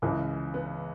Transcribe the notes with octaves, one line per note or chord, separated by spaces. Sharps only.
C#2 C#3 E3
B3